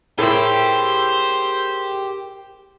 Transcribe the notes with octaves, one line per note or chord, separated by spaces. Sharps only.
A2 E4 G4 G#4 A#4 C5